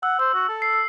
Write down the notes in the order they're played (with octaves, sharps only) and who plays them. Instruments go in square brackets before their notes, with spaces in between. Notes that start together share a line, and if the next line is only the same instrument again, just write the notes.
[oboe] F#5 [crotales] E6
[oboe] C5 [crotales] E6
[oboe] F#4
A4
[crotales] C7
E6